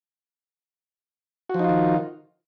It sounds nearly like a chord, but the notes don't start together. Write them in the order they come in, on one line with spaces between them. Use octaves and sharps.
F#4 F3 D#4 F4 D#3